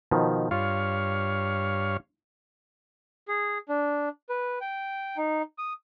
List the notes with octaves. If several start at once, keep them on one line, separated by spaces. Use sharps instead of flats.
B2 D#3 F3
G2 F4 C#5 F5
G#4
D4
B4
G5
D#4
D#6